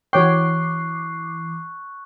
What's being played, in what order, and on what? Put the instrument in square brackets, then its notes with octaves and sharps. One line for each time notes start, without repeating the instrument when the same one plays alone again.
[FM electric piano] E3 D6 C7 [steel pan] F#4 C#5 G5 [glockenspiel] C#6 F#6